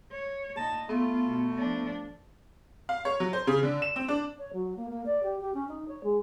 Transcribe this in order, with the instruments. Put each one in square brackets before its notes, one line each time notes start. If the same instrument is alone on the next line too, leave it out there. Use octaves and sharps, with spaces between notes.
[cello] C#5
[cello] A#2 D#4 [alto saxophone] A5
[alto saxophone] A3 [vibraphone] B3 [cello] F4
[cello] B2
F3 D4
[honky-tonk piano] F5
C#5
F#3
C5
C#3
D3
E7
C4
D4
[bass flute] C#5
F#3
A#3
A#3
D5
G4
G4
C#4
D#4
C#5
G#3